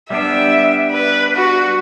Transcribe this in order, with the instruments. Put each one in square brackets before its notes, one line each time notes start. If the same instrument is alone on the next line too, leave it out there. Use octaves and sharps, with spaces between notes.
[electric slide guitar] G3 B3 D4 [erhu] E5
[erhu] B4
F#4